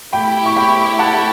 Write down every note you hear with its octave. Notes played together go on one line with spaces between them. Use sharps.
A3 E4 G4 G5 B5
C#6
G5 B5
F#5 A5